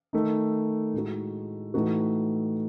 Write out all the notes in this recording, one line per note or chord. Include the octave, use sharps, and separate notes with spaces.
D#3 A3 D#4
A2 G#3 D#4 F#4
A2 E3 A3 D#4 F#4